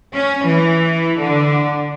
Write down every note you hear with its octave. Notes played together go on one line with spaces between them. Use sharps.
C#4
E3
D3